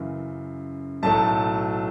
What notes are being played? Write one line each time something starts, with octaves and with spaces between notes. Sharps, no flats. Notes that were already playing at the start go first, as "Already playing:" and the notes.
Already playing: F#2 C#3 E3
B1 A2 F#3 A3 A5